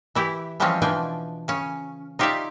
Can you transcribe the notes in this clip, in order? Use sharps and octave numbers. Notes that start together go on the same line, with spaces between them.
E3 E4 G4
E3 F3 G3 G#3 C4 C#4
B2 E3 F3 D4 G5 G#5
C#3 C#4
D#4 F4 G4 C#5 D5 E5